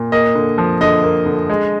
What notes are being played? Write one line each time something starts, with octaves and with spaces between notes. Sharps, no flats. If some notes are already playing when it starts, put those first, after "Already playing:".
Already playing: A#2
A#3 D#5
D3
F3
D3 D#5
A#3
D3
G#3